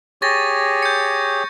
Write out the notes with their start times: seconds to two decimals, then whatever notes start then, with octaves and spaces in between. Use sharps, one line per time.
0.22 G4 G#4 C#5 C#6 A6 A#6
0.82 G6 C#7